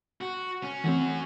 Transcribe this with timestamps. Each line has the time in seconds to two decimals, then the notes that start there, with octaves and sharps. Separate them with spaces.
0.21 F#4
0.63 C#4
0.84 E3 A3 C4 C#4 F#4